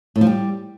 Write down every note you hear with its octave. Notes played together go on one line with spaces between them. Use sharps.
A2
F3
G3